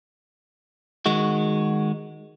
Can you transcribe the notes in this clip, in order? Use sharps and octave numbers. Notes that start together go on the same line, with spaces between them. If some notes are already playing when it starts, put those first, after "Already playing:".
D#3 G#3 F#4